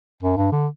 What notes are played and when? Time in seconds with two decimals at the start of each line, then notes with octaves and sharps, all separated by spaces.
0.22 F#2
0.37 G2
0.52 D3